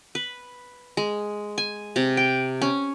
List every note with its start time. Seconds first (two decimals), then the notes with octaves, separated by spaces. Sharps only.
0.15 B4
0.97 G#3
1.58 G#5
1.96 C3
2.17 G5
2.62 C#4